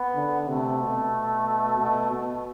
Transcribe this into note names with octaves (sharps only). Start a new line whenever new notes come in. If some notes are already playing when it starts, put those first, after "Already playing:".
Already playing: B3
D3
C3 A3
B2
B2
B2